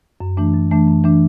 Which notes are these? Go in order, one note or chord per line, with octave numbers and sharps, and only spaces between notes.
F#2
E3 A3 D4
F#2
E3 A3 D4
F#2
E3 A3 D4